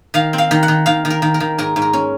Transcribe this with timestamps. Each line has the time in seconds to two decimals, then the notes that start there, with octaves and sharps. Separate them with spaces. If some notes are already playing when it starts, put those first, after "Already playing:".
0.14 D#3 F5
0.33 C4
0.38 F5
0.51 D#3
0.63 F#5
0.68 D#3
0.86 D#3 F5
1.05 D#3
1.10 A#4
1.22 D#3
1.34 A#4
1.40 D#3
1.58 G#2 A#4
1.76 G#2
1.82 A#4
1.93 C#4